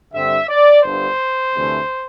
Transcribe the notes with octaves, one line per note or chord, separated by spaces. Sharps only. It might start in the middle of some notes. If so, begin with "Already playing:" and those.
G2 D3 G3 C4 E5
D5
G1 G2 D3 C5
D2 C3 E3 A3